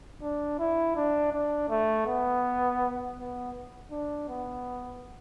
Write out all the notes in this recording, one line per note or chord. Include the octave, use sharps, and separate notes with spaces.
D4
E4
D4
D4
A3
B3
B3
D4
B3